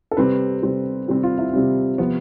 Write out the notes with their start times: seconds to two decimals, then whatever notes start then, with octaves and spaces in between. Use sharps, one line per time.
0.12 A4
0.17 C3 G3 C4 B4
0.63 C3 G3 C4
1.08 C3 G3 C4 G4
1.23 F4
1.39 E4
1.53 C3 G3 C4
1.98 C3 F3 B3